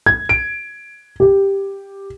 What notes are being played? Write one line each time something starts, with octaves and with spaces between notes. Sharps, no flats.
G#6
D7
G4